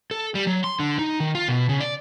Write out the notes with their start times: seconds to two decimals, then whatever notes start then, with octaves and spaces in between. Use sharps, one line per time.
0.11 A4
0.35 G3
0.47 F#3
0.64 C6
0.80 D3
0.99 D#4
1.20 D#3
1.35 F4
1.48 B2
1.69 C#3
1.80 D5